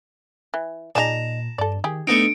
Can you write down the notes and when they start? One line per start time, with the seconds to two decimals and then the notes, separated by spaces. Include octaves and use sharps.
0.54 E3
0.95 A#2 D#4 G#4 D5 A5 A#5
1.58 G2 A4 D5
1.84 D#3 G4 G#4
2.07 A3 B3 D4 D#4 C#7 D7